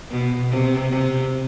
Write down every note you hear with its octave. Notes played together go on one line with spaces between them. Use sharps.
B2
C3
C3